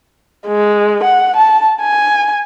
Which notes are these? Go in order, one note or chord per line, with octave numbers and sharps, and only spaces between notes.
G#3
F#5
A5
G#5